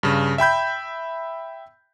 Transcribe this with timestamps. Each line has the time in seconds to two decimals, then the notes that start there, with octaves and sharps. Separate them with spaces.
0.03 G2 C#3
0.38 E5 G5 B5 G6